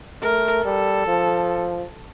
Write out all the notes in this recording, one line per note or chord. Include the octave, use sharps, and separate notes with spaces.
A3 A#4
G3 A4
F3